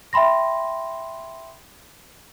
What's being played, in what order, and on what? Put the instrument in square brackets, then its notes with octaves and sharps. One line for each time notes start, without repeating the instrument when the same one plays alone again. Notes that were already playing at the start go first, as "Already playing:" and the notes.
[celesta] E5 G5 B5 C6 A#6